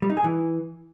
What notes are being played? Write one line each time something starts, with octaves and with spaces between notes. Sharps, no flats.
G3
D#4
G#4
E3